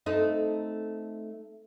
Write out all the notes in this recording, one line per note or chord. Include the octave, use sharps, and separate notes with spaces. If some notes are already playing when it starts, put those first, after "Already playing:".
A3 C4 D#4